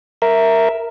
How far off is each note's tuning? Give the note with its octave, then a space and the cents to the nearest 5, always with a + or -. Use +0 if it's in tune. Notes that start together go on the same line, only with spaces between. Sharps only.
A#4 -5 E5 +0